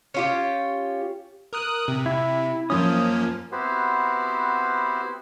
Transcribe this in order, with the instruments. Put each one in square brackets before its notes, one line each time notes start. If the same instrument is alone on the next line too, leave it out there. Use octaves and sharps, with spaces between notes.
[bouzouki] C#4 F4 G4
[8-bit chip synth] A#4 D#6 F#6
C3
[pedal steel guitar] E4
[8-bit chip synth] F#2 F3 C#4 [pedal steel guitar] A#3 D#6
[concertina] B3 C4 E4 F#4 G4 C5